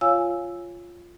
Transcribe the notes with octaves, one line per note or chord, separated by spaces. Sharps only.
F4 C#5 F5 G#5 E6